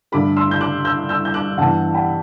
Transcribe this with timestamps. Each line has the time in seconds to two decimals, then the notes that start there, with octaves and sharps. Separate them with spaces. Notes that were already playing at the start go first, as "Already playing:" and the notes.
0.12 G2 D3 A3 B5 D6
0.37 C6 E6
0.51 G6
0.61 D6 F#6
0.85 E6 G6
1.09 E6 G6
1.25 G6
1.34 D6 F#6
1.58 G2 E3 B3 F#5 A5
1.94 G5 B5